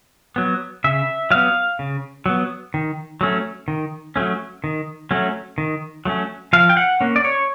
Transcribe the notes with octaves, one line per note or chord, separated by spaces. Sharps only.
F#3 B3
C#3 E5
F#3 B3 F5
C#3
F#3 B3
D#3
F#3 A3 C#4
D#3
F#3 A3 C#4
D#3
F#3 A3 C#4
D#3
F#3 A3 C#4
F3 F5
G5
F#5
A#3 C#4
D5
C#5